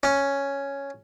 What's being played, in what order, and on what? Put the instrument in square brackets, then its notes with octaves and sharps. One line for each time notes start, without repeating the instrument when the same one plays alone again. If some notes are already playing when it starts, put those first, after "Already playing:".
[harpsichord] C#4